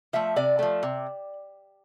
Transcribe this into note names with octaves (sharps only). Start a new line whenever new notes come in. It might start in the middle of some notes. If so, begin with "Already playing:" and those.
F3 A3 E5
C3 D5
F3 A3
C3